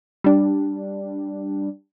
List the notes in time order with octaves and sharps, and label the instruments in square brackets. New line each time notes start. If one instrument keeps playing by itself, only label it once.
[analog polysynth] G3 D4